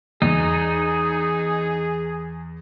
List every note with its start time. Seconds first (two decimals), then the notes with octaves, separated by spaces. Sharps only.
0.22 E2 D#4 G#4